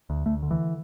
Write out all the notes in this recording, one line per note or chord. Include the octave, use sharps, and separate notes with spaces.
D2
D2 A3
D3
E3